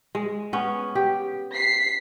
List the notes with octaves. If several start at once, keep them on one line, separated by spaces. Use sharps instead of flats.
G#3
B3 C#4
G4
B6 C7